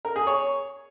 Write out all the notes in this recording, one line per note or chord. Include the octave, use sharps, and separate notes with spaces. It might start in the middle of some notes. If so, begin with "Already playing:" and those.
A#4
G#4
C#5